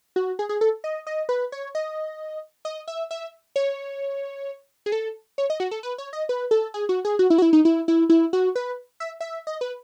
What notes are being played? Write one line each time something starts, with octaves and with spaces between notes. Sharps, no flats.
F#4
G#4
G#4
A4
D#5
D#5
B4
C#5
D#5
D#5
E5
E5
C#5
G#4
A4
C#5
D#5
F#4
A4
B4
C#5
D#5
B4
A4
G#4
F#4
G#4
F#4
E4
F#4
E4
D#4
E4
E4
E4
F#4
B4
E5
E5
D#5
B4